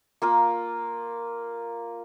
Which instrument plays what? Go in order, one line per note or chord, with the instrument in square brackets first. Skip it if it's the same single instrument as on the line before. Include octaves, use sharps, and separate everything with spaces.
[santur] A#3 F4 A#4